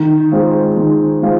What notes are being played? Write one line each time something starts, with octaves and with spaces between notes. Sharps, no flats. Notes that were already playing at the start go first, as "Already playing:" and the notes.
Already playing: D#3
G#3 C4 F4 G#4
D#3
G#3 C4 F4